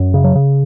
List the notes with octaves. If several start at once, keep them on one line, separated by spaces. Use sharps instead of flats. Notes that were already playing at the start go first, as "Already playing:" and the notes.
Already playing: F#2
C#3
F#3
C#3